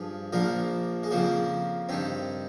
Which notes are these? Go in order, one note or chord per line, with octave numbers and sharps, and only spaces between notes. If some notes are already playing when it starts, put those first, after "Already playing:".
Already playing: G2 F3 G#4
A#1 A#2 F3 A#3
G#3
F2 C#3 F3 A#3
G2 D#3 C4